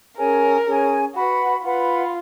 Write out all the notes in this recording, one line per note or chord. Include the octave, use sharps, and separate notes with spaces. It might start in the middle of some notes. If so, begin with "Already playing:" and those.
C#4 G#4 A#4 C#5 G#5
C#4 G#4 C#5 G#5
F#4 B4 F#5 B5
F4 B4 F#5 B5